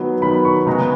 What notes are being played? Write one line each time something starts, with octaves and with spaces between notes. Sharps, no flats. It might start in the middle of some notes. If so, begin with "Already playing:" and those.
Already playing: D#3 F#3 B3
D#3 F#3 B3 B5
C#6
C#3 G#3 B3 A#5